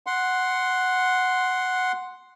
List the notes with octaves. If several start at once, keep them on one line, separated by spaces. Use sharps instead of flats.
F#5 C6